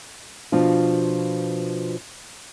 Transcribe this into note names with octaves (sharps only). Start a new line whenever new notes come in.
B2 F3 D4 F4